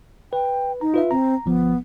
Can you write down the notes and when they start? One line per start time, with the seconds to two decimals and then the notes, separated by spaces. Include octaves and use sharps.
0.33 B4 G5
0.81 D#4 A#5
0.94 F4 B4 E5
1.11 C4 A#5
1.46 G1 F3 B3